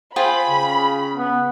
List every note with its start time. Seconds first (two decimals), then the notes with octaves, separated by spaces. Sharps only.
0.16 F4 G#4 C5 G5 B5
0.48 C#3
1.16 B3